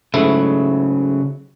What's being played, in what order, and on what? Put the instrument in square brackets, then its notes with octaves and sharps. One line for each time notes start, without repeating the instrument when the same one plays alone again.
[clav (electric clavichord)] G#2 A3 E4 [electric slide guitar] C#3 F#3